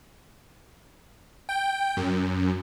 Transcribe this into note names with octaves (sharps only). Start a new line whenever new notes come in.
G5
F#2